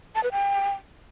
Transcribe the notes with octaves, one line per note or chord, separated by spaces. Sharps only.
A5
B4
G5